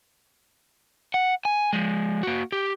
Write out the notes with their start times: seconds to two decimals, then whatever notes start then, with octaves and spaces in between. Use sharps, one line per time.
1.14 F#5
1.45 G#5
1.73 F3 G#3
2.23 A#3 F#4
2.52 G4